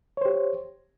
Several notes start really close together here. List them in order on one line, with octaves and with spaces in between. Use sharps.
C#5 C5 G4